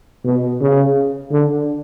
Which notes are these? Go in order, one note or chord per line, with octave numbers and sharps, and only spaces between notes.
B2
C#3
D3